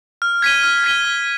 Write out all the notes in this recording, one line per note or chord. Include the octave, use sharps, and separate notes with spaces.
F6
G#6 B6 D#7 G7
F6
G#6 B6 D#7 G7
F6